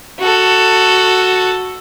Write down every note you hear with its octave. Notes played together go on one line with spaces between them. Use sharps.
F#4 A4